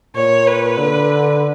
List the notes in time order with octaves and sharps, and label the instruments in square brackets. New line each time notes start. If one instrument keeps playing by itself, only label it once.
[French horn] A#2 [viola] C#5
[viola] B4
[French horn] D3